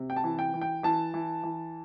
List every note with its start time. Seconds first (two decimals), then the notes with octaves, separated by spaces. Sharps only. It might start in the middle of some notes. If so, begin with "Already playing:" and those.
Already playing: C3
0.10 G5
0.17 A5
0.24 E3
0.39 G5
0.54 E3
0.62 G5
0.83 E3 A5
1.14 E3
1.43 E3